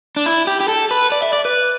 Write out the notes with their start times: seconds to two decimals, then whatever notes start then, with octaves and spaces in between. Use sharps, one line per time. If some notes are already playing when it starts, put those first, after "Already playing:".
0.16 D4
0.26 E4
0.47 G4
0.60 G4
0.68 A4
0.91 B4
1.12 D5
1.22 E5
1.33 D5
1.45 B4